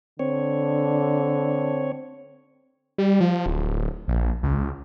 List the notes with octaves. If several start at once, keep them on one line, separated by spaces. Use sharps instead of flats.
D3 C4 C#5
G3
F3
D1
A#1
C#2